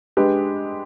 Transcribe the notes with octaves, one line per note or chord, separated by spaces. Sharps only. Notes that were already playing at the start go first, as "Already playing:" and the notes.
G#3 D4 G4 B4